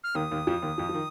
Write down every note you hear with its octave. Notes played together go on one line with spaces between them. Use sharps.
F6
D#2 D#3 D#6
D#2 D#3
F2 F3
D#2 D#3
F2 F3
F3
D#3